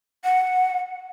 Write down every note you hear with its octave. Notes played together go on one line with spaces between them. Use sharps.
F#5